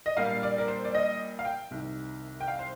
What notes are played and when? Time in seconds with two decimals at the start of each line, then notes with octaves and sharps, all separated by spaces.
0.06 D#5
0.17 A#2 G3 A#3 D4 F5
0.43 D5
0.58 A#4
0.68 C5
0.85 D5
0.95 D#5
1.39 F5
1.45 G5
1.71 C2 C3 D#3
2.41 G5
2.48 F5
2.59 C5